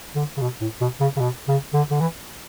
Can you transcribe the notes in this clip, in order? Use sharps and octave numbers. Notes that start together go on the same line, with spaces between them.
D3
C#3
B2
A2
B2
C#3
C#3
B2
C#3
D3
D3
E3